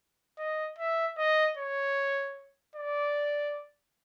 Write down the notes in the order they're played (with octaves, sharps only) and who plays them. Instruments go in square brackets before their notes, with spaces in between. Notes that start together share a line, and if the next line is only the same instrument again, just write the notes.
[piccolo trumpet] D#5
E5
D#5
C#5
D5